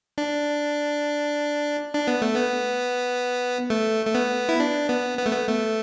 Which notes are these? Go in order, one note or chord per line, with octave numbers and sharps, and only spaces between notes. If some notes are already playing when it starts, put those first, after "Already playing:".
D4
D4
B3
A3
B3
A3
A3
B3
E4
D4
B3
B3
A3
B3
A3